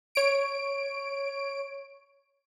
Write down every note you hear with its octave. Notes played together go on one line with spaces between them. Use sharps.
C#5 D7